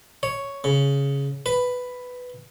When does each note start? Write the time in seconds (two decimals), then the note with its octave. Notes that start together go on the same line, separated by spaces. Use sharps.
0.23 C#5
0.64 C#3
1.46 B4